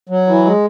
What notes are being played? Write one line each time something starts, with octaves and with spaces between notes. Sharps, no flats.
F#3
E3
G#3